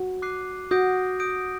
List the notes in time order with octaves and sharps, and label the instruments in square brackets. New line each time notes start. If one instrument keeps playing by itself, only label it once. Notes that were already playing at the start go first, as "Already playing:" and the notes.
Already playing: [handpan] F#4
[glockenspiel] D6 F#6 C7 D#7
[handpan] F#4 [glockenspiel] D#6 G6 A#6 D7
[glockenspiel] D#6 G6 A#6 D7